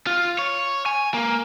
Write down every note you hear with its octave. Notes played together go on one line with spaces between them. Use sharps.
F4
C#5
G#5
A#3